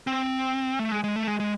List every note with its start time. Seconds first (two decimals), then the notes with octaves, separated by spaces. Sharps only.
0.07 C4
0.79 A3
0.92 G#3
1.04 G#3
1.16 A3
1.27 G#3
1.40 G#3